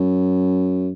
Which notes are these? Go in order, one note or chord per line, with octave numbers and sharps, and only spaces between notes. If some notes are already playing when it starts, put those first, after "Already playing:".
Already playing: F#2